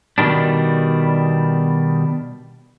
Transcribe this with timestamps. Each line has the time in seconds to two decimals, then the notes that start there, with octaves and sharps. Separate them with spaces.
0.18 B2 D#3 G3 D4